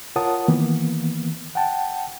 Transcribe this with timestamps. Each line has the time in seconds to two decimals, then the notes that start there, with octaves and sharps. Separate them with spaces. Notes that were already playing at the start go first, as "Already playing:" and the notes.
0.16 F4 A#4 C#5 F#5 A5 D#6
0.48 D#3 E3 A#3 B3
1.55 F#5 G5 A5